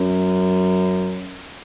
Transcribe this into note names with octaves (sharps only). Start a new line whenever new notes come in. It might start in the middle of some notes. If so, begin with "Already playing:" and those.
Already playing: F#2